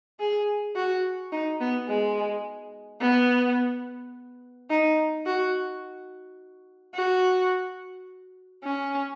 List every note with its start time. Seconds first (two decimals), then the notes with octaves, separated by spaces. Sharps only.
0.20 G#4
0.76 F#4
1.32 D#4
1.61 B3
1.89 G#3
3.01 B3
4.70 D#4
5.26 F#4
6.95 F#4
8.64 C#4